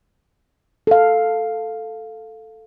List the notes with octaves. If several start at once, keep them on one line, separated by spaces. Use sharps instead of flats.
A4 F5